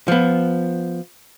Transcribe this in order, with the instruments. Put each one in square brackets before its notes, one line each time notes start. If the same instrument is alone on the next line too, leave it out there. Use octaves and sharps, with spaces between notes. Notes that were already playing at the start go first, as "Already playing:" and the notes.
[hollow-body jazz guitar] F3 B3